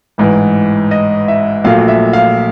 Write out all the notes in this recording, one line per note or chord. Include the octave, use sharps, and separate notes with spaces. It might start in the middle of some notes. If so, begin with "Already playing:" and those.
A1 G#2 E3
D#5
E5
A#1 A#2 F#3 A3 F5
E5
F5